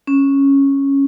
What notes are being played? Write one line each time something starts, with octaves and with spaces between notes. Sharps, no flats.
C#4